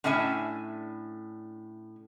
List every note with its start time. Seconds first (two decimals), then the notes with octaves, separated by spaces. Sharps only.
0.04 A2 C#4 D4 E5 G#5